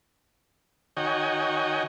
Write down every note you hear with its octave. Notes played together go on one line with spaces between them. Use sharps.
D#3 F#4 C#5 D#5 G5 G#5